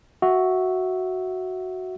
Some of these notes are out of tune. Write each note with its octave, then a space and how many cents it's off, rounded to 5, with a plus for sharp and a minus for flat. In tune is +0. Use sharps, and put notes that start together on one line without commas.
F#4 +0 E5 -5